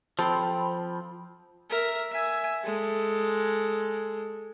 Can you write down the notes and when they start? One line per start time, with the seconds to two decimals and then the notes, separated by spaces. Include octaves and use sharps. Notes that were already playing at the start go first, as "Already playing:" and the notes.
0.19 F3 C4 A4 G5 B5 C6
1.70 A#4 E5
2.11 E5 G#5
2.63 G#3 A4